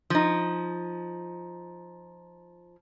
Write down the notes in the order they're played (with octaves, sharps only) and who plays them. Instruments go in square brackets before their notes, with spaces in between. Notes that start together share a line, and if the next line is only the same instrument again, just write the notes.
[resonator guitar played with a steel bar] F3 D#4